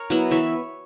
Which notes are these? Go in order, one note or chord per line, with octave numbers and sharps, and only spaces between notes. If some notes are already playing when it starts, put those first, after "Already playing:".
Already playing: A#4 C#5
F#3 B3 E4
E3 C#5 E5